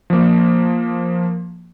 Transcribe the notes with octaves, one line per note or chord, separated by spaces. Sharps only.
F3 A#3